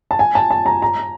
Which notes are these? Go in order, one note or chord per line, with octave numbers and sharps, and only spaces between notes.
A5
G#5
A5
A5
A#5
A#5